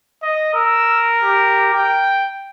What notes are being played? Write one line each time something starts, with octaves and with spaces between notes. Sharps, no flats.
D#5
A#4 E6
G4
G5